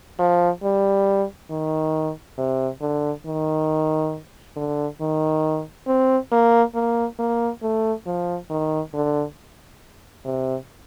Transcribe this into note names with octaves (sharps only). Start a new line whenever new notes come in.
F3
G3
D#3
C3
D3
D#3
D3
D#3
C4
A#3
A#3
A#3
A3
F3
D#3
D3
C3